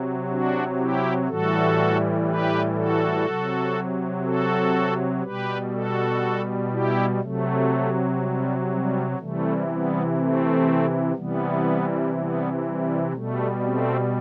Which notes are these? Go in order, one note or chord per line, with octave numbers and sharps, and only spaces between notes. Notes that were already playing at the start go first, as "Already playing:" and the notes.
Already playing: C3 F#3
D4 F#4
E4 G4
A2 E3 G3 F#4 A4
G4 B4
F#4 A4
C3 F#3
F#4 A4
B2 G3 G4 B4
F#4 A4
E4 G4
C3 F#3 A3
G3
G3
C3 E3 G3 A3
G3 B3
A3 C4
C3 E3 G3 B3
G3 B3
G3
B2 G3 A3
A3 C4